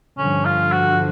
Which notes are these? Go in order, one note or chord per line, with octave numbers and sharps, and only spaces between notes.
G2 D3 F3 C#4
F4
F#4